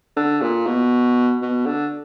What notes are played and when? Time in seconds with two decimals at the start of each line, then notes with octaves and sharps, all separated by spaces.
0.17 D3
0.42 A#2
0.67 B2
1.42 B2
1.66 D3